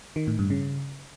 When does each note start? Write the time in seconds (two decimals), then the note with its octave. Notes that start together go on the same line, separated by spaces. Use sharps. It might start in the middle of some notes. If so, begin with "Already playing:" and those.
0.16 D#3
0.27 A2
0.39 G2
0.50 C#3